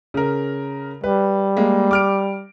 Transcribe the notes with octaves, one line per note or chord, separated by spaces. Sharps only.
C#3 A#4
G3 B4
G#3 A#3
D6 F6 D7